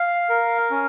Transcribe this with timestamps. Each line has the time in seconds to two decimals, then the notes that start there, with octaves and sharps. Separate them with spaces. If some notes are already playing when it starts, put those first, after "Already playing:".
Already playing: F5
0.29 A#4
0.70 C#4